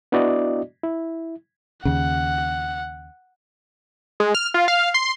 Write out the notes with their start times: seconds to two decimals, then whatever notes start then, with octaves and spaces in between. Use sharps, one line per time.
0.12 B3 D4 E4 F#4 D5 D#5
0.84 E4
1.85 D#2 C#3 F#5
4.20 G#3
4.35 F6
4.54 F4
4.68 F5
4.94 C6